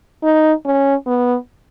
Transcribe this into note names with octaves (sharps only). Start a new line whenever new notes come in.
D#4
C#4
B3